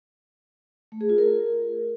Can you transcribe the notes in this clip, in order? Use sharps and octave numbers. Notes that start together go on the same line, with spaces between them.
A3
G#4
F4
A#4